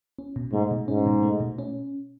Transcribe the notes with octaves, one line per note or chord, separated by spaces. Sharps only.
C#4
B2
G#2 A3
B2
G#2 C#4
B2
A3
B2
C#4